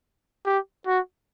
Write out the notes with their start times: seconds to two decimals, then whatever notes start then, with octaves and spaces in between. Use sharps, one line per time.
0.46 G4
0.87 F#4